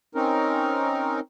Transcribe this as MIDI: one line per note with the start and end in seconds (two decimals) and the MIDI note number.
0.15 1.20 60
0.15 1.20 61
0.15 1.20 63
0.15 1.20 70